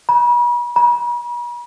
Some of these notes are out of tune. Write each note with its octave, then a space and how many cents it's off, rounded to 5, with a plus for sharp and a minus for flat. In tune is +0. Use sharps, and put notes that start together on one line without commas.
B5 -40
B5 -45